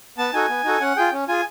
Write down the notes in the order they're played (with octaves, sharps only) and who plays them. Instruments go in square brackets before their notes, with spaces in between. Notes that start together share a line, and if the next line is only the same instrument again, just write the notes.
[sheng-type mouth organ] B3 A5
D#4 F#4 A4 G#5
B3
D#4 F#4 A4
C#4 F#5
F4 G#4 G5
C#4
F4 G#4 G#5